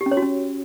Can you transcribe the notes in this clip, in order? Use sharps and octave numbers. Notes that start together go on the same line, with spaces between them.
G4
C#4
C#5
F#4
C#4